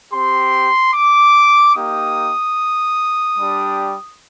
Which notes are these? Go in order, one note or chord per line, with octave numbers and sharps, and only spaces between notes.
C4 G4 C6
D6
A#3 D#4 G4 D#6
G3 D4 G4